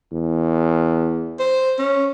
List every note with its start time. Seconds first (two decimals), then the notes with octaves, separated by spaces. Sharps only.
0.12 E2
1.39 C5
1.79 C#4